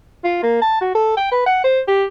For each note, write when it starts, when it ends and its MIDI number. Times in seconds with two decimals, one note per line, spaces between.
0.25 0.40 65
0.43 0.58 58
0.62 0.81 81
0.81 0.93 66
0.95 1.14 69
1.17 1.30 79
1.32 1.44 71
1.46 1.62 78
1.64 1.81 72
1.88 2.05 67